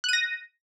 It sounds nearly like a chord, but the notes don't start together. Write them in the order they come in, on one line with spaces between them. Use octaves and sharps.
F#6 D#7 A#6